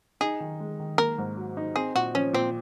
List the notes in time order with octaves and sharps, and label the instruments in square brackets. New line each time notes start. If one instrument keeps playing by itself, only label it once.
[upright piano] D#4 [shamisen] G#4
[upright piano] D#3
G#3
D#3
[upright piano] A#3 [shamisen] A#4
[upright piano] G#2
F#3
D#4
[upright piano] C4 [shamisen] G#4
[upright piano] A#2 [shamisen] F#4
[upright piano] F3 [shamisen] C#4
[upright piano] A#2 [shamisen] C4